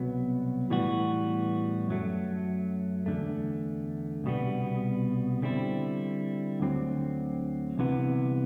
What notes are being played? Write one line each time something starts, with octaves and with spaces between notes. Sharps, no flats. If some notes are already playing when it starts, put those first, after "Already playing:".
Already playing: C2 B2 F#3 B3
A2 E3 G3 B3 F#4
F#2 F#3 A3
E2 D3 A3
C2 B2 G3 B3
D3 G3 C4 E4
D2 D3 F#3 C4
C2 C3 E3 B3